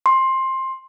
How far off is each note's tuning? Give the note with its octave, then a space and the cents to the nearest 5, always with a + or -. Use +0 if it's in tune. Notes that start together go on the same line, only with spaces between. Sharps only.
C6 +15